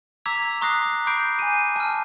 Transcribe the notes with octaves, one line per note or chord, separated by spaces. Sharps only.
A#5 D6 E6 G#6 B6 F7
A#5 C#6 D#6 F#6 A#6 C7
B5 C#6 D6 G6 C7 D7
G#5 D#7
A5 F6